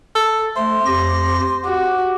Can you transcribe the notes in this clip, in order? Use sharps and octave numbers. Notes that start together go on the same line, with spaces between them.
A4
A3 C5
F2 G4 A#6
F#4 G4